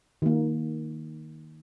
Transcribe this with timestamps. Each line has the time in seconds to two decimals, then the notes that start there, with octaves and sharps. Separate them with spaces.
0.22 D#3 A#3